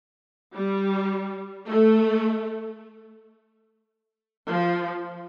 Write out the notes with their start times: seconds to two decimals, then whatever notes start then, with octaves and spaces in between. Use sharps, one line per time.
0.56 G3
1.68 A3
4.49 F3